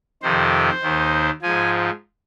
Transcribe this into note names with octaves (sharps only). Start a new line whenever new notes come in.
F2 C3 D#3 C5
D#2 D#3
G#2 F3 G#5